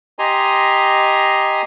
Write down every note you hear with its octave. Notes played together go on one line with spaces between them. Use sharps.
G4 D#5 G#5 A#5 C6